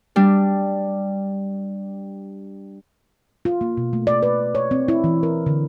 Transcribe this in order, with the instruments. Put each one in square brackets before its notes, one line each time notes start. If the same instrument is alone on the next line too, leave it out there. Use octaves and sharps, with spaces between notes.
[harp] G3 D4
[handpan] F4
A#3
B2
A3
D5
B4
C#5
C4
E4
E3
A#4
D3